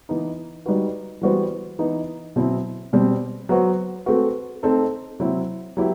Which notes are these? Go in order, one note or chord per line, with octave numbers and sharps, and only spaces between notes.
E3 B3 D#4
G3 D#4 F#4 B4
E3 G3 B3 F#4 C5
E3 B3 D#4
B2 F#3 C4 E4
B2 G3 C4
F#3 B3 F#4 C5
A3 C4 F#4 B4
A3 C4 D#4 A4
C3 F#3 C4 E4
F#3 B3 E4 G4